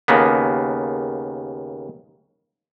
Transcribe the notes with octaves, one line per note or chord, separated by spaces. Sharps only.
D#2 C#3 A#3 B3